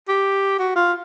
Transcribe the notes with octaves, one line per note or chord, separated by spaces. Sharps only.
G4
F#4
F4